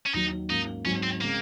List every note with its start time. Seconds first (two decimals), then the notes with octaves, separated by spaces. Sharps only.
0.06 C#4
0.14 D#2 D#3 F#3 D#4
0.49 G#2 F#3 A#3 C#4 D#4
0.85 G#2 F#3 C4 C#4
1.03 C4
1.21 C#3 G#3 A#3 C4